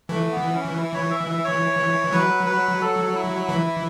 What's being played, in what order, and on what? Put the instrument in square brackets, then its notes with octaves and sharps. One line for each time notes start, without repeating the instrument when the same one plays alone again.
[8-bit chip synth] E3 [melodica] A3
[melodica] B3
C#4
E4
C#5
E5
E5
C#5
[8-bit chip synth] F#3 [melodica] B4
[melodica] B4
A4
E4
[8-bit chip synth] E3